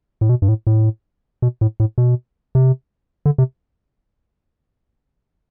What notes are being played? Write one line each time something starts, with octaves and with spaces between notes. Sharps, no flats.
A2
B2
G2
A2
A2
B2
A2
A2
B2
C3
D3
C3